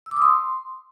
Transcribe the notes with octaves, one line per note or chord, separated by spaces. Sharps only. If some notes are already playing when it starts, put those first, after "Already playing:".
E6
D6
D#6
C6